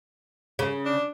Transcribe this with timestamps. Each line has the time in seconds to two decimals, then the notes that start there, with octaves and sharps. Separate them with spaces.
0.59 C#3
0.85 D4